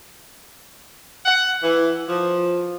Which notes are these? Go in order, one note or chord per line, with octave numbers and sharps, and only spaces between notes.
F#5
E3
F3